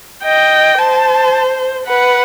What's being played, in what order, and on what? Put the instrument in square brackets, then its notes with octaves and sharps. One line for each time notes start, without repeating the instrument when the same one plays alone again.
[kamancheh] D#5 [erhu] G5
[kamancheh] C5 [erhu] A5
[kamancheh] B4 [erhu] F#5